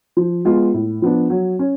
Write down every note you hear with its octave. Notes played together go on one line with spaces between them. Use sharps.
F3
G#3 B3 F4
A2
F3 B3 D4
F#3
C#4